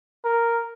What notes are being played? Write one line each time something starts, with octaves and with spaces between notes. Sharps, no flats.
A#4